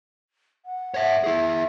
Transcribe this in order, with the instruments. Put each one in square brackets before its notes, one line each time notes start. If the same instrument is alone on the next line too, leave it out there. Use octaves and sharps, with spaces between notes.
[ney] F#5
[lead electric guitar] C#5 E5
[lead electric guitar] E4 G#4 [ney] E5